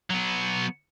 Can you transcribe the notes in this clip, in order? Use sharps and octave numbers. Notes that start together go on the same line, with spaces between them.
F#3 B3